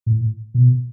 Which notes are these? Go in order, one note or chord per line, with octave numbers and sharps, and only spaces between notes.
A2
B2